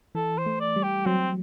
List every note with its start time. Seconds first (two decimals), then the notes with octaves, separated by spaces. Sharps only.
0.15 E3 A4
0.38 C5
0.46 A3
0.60 D5
0.76 G3
0.83 G4
1.06 F#3 C4